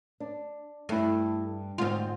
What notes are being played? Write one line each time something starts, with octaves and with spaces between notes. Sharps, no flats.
D4
G2 A3 E4
D2 G#2 C4 F4